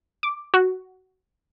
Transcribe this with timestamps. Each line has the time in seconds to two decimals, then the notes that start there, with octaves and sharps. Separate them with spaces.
0.23 D6
0.54 F#4